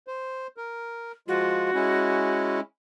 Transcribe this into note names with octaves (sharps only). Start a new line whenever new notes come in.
C5
A#4
F3 G#3 F4 F#4
G#3 C#4 E4